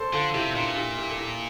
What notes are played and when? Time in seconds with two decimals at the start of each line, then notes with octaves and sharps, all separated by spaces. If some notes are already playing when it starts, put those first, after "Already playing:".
Already playing: A4 C5 D5
0.13 D3 F4 A4
0.34 C3 E4 G4
0.55 A#2 D4 F4
0.76 E4 G4
0.97 E4 G4
1.09 A4
1.17 E4 G4